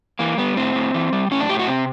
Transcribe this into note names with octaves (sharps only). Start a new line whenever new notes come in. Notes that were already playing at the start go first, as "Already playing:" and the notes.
E3 A#3
G3 B3
A2 C4
A2
E3
G3
A2 C#4
D4
A2 G4
F#4
C3 C4